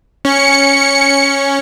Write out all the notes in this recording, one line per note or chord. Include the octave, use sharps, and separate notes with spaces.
C#4 C#7